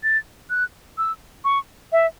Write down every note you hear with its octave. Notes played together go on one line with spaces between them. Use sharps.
A6
F#6
E6
C#6
E5